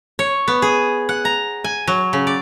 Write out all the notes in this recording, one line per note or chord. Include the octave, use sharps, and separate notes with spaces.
C#5
B3
G#4
F#5
A#5
G#5
F#3
C#3
D5